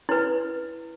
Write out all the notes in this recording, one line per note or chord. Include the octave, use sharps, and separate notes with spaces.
E4 B4